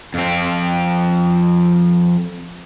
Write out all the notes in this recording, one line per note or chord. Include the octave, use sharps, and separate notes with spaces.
F2 C4